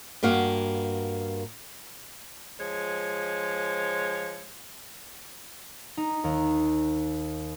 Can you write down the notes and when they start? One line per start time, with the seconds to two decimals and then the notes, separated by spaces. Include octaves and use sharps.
0.23 G2 A#3 F#4 F5
2.59 F3 G#3 C5 C#5
5.97 D#4
6.24 D#2